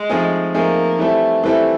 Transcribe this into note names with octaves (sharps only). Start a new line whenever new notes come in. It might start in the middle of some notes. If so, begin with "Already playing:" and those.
Already playing: G#3
F3 A3 C4 D#4 G#4
F3 A3 A#3 C4 D#4 G#4
E3 G3 A3 C4 E4 A4
E3 G3 A3 C4 E4 A4